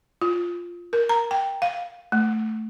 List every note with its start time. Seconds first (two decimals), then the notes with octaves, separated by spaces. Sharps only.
0.21 F4
0.93 A#4
1.09 A#5
1.31 G5
1.62 F5
2.12 A3